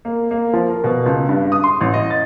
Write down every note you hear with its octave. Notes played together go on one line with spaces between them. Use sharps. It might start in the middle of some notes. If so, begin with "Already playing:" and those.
A#3
A#3
F3
A#4
B2
C#2
G2
D#6
C6
A1
D#5
A6